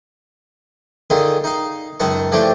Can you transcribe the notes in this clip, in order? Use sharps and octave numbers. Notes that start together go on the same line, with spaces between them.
D3 D#3 F4 G#4
D#4 F5
C#2 F#2 D#3 F#5 A5 C#6
E3 F3 A3 D4 G4